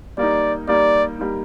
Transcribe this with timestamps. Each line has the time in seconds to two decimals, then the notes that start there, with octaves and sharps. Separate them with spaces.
0.17 G3 A#3 D#4 D5
0.68 G3 A#3 D#4 D5
1.19 G3 A#3 D#4